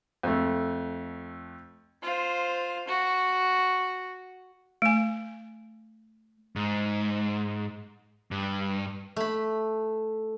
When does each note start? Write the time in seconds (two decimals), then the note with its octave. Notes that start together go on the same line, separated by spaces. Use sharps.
0.23 F2 A3
2.03 F4 C5
2.88 F#4
4.82 A3 G#5
6.56 G#2
8.31 G2
9.16 A3 B5